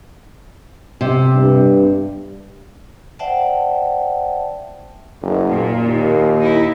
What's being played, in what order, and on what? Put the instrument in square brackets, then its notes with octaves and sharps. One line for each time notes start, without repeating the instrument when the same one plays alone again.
[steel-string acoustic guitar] C3
[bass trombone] G2
[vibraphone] C5 D5 E5 F#5 G5 A5
[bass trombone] F#1
[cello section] A#2
[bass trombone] D#2
[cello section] D#4 E4